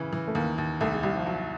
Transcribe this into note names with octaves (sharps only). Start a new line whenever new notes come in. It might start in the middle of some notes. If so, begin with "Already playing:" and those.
Already playing: C#3 E3
E3
A3
D#2 A#3
D#2
C2 A3
G#3
C2 G3
F3
F#3